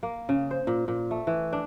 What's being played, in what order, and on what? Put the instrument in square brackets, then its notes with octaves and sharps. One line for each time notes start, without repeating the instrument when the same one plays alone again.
[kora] A#3
C#3
C5
A#2
A#2
A3
E3
D4